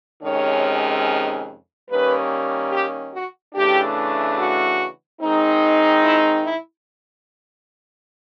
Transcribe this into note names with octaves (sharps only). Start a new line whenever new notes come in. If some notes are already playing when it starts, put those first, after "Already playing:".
F2 C3 D#3 G#3 C#4 C#5
D#3 G3 A#3 C#4 B4
G4
F#4
C#3 E3 A3 D4 G4
F#4
D#3 G#3 C4 D#4
E4
E4